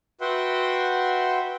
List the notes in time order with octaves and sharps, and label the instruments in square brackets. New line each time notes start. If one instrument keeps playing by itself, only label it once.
[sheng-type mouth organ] F#4 B4 E5 F#5 G5 C6